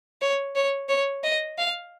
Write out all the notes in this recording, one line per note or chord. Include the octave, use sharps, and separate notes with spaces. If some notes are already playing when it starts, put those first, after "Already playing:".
C#5
C#5
C#5
D#5
F5